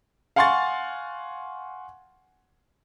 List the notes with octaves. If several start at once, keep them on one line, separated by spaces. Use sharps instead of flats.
F5 F#5 G#5 C6 C#6 A6